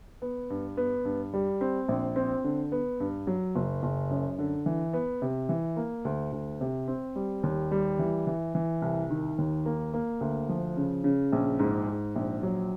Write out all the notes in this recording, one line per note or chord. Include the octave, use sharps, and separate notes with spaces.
B3
G2
B3
G2
G3
C4
A#1
C4
D3
B3
G2
F#3
F#1
F#1
F#2
D3
E3
B3
C3
E3
A#3
D2
D2
C3
C4
G3
D#2
G3
E3
E3
E3
C2
D#3
D#2
A#3
A#3
D2
F3
C#3
C#3
A#1
G#2
G#2
A#1
F#3